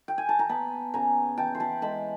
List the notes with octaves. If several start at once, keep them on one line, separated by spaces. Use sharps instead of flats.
G5
G#5
A5
A#5
B3 A5 B5
C#3 G#5 A#5
E3 G5 A5
C6
A5 B5
G#3 A5 B5